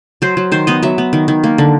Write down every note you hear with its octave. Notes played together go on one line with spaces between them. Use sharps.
F#3 C5
F#3
D#3 C5
B3 D#5
F#3 E5
B3
D#3
D#3
A#3
D3